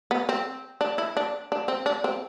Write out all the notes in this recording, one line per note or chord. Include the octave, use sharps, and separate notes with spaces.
B3
C4
D4
E4
D4
D4
C4
D4
C4